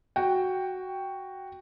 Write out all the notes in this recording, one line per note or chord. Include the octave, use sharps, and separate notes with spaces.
F#4 G5